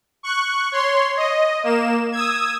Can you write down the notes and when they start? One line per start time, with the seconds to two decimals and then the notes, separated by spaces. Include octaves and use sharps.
0.23 C#6 F#6
0.72 C#5 C6
1.17 D#5
1.64 A#3 E7
2.12 D#6 E6 G#6